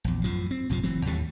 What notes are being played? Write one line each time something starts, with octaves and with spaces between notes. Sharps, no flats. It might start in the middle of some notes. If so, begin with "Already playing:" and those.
A#1 E2
F#2 A2 F3
C4
A#1 F#2 C3 F3
F#1 E3 F#3 C4
D#2 A2 G3 A3